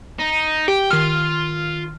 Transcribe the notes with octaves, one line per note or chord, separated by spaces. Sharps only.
D#4
G4 G5
D#3 F4 F6